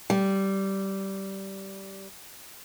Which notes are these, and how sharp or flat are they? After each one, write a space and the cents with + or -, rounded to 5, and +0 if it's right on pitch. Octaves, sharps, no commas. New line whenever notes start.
G3 -15